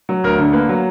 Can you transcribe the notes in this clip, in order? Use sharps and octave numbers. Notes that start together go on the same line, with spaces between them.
F#3
D2 A#4
D3
A#3 B4
F#3